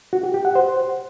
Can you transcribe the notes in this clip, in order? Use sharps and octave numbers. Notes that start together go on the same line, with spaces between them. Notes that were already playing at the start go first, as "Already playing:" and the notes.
F#4
G4
G4
F#5
C5